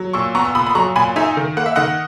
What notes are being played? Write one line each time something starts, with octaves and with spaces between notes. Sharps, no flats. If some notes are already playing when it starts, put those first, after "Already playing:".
Already playing: F#3
A#2 C#6 E6
B3 A#5 C#6
E6
A#2 B5 D#6
B5
F#3 A#5 C#6
A#2 G#5 B5
D#4 E5 G#5
D#3
A#3 F#5
E5
D#3 D#5 F#5